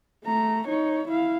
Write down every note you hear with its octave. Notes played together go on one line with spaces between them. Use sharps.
A3 A#5
D#4 C#5
E4 F5